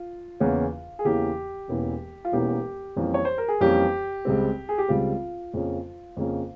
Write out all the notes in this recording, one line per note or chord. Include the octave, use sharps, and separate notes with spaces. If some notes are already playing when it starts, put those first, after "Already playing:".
Already playing: F4
E2 C#3 E3 A#3 C#4
G#4
E2 C#3 E3 A#3 C#4 G4
E1 E2 E3 A#3 C#4
F4
E1 E2 E3 A#3 C#4 G4
F2 E3 G3 A#3 C#4
C#5
C5
A#4
G#4
F2 E3 G3 A#3 C#4 G4
C#2 C#3 G3 C4
G#4
G4
C#2 C#3 G3 C4 F4
F2 C#3 F3 A#3 C#4
F2 C#3 F3 A#3 C#4